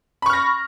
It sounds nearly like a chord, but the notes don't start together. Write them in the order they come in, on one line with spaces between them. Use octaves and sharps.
B5 C#6 F6 A#6